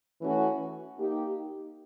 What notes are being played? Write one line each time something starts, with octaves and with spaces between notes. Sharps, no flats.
E3 A3 C#4 F#4
A#3 D#4 G4